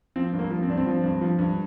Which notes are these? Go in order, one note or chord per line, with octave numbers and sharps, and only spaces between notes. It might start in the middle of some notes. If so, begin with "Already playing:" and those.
F3 C4
G2
A#3
F3
C4
G2 D4
C4
F3
G2
F3
G2